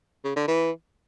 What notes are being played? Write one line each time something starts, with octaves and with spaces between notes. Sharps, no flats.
C#3
D3
E3